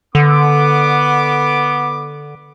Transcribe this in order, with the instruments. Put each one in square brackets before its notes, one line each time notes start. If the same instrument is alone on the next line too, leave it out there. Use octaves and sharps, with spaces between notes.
[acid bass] D3 [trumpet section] B3 D6